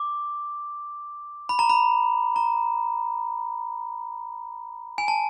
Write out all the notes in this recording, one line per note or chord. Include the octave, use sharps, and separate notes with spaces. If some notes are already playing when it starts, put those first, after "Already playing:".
Already playing: D6
B5
A#5
B5
A#5
G#5
A5